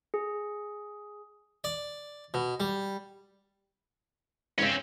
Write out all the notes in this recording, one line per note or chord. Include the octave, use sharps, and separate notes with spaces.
G#4
D5
B2
G3
E2 G#2 C#3 C4 C#4